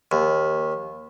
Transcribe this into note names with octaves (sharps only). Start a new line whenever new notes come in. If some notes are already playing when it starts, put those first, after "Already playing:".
D#2